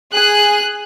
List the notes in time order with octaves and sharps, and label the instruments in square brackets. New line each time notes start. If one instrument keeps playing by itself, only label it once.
[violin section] G#4 F#6